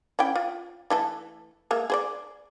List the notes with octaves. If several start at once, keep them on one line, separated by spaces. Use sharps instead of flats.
C#4 E4 G5
F4
E3 A3 A4
G#3 A#3 E5
G#4 C5 D5